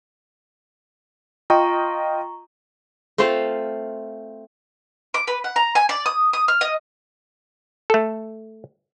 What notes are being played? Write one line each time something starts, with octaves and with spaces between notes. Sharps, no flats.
F4 D#5 G5 A#5 C#6
A3 C4 F4 C5 F5
D6
B4
F#5
A#5
G#5
D5
D#6
D#6
F6
D#5
A3 A4